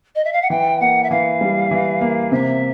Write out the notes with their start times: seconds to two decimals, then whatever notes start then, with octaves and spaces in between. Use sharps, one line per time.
0.15 D#5
0.24 E5
0.32 F5
0.41 F#5
0.50 E3 G5
0.80 A#3 F#5
1.03 E5
1.10 E3 F5
1.41 G3
1.71 E3
2.01 A#3
2.32 C3 E5